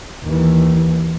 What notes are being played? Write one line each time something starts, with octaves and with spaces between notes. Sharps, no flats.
D#2 E3